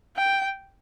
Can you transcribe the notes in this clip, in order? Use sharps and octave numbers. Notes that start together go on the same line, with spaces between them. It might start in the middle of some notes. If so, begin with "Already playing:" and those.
G5